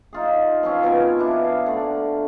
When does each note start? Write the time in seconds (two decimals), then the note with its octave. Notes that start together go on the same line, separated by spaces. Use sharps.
0.13 D#4 F4 G#4
0.63 F3 C4 C#4
0.83 B2 A#4 G#5
1.19 D4 E4
1.44 F5
1.66 D3 A3